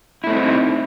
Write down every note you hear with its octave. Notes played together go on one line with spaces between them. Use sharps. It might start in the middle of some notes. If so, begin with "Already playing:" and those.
A3 C4 D#4 E4